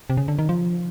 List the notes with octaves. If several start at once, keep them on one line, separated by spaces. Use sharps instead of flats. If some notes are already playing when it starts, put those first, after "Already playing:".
C3
C#3
D3
D#3
F3